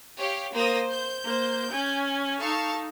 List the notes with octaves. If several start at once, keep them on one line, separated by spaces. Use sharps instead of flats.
G4 C#5 F5
A#3 C5 D#6 A#6
G6
A#3 C5
C#4 G#5
D#4 A4 F5 A5 C#6